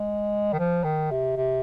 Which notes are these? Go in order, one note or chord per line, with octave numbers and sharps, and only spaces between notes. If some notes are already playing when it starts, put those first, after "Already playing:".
Already playing: G#3
D#3
F3
D#3
C3
C3